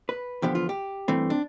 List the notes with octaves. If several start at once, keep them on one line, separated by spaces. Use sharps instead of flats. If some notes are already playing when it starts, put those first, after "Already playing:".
B4
E2 D3 F3 B3 G4
F4
G4
G2 E3 A3 C4
D4